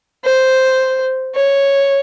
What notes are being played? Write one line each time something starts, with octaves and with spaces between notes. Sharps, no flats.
C5
C#5